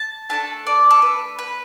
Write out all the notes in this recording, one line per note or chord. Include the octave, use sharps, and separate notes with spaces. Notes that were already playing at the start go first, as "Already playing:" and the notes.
Already playing: A5
A3 D4 A4 A5
D5
A4
B4
B4